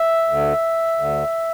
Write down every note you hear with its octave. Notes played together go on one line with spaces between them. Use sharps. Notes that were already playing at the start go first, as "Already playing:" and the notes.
Already playing: E5
D2 D3
D2 D3